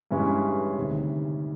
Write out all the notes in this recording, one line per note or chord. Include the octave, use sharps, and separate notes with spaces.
G2 E3 G#3 C#4
D2 C3 D#3